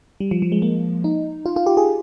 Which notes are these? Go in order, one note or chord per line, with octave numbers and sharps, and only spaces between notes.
G3
F3
F3
G#3
A#3
D#4
F4
F4
G4
G#4